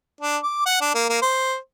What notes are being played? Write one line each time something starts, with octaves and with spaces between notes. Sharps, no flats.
D4
D6
F#5
D4
A#3
A#3
C5